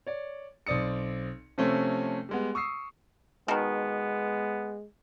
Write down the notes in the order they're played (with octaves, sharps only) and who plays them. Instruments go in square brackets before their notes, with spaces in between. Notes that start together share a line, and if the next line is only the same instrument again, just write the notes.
[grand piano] C#5 D5
B1 C4 D5 D#6 C#7
C3 F3 A3 C4 C#4
G3 G#3 B3
C#6 D#6 E6 C7
[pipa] B2 D#3 [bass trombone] G#3 [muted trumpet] B3